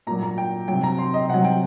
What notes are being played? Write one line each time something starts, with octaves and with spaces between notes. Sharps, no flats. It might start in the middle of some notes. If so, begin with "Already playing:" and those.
A#2 F#3 A#5
A#5
G5
C3 F#3 G5
A#5
C6
D#5
C3 F#3 F#5
G5